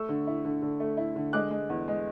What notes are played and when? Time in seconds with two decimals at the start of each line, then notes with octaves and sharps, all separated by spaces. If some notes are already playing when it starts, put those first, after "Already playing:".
Already playing: A3 C#6 E6
0.09 D3
0.27 E4
0.45 D3
0.62 D3
0.80 A3
0.97 E4
1.16 D3
1.33 G#3 D6 F#6
1.51 G#3
1.69 E2
1.88 G#3